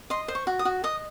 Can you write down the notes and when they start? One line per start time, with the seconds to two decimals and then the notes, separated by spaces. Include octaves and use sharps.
0.10 D#5 C6
0.28 C5
0.35 C#6
0.47 F#4
0.59 D#6
0.65 F#4
0.84 D#5 D#6